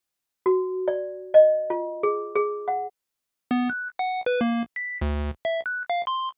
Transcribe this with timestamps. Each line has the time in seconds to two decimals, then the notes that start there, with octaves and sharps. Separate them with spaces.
0.46 F#4
0.88 D5
1.34 D#5
1.70 F4
2.03 G#4
2.36 G#4
2.68 F#5
3.51 B3
3.70 F#6
3.99 F#5
4.26 B4
4.41 A#3
4.76 B6
5.01 D2
5.45 E5
5.66 F#6
5.90 F5
6.07 C6